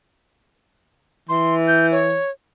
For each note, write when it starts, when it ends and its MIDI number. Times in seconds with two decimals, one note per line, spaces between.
1.29 2.20 52
1.29 1.55 84
1.68 1.87 91
1.92 2.31 73